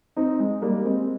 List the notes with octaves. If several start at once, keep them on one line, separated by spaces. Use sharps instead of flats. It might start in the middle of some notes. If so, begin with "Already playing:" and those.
C4 D#4
G#3
G3 A#3
G#3 C4